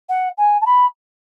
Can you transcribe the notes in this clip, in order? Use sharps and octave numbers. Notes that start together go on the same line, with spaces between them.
F#5
G#5
A5
B5